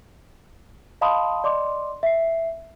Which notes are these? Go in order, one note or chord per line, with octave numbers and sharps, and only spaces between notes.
D#5 F5 A5 B5 C6 D#6
D5 D#5 C6 D6
E5 C7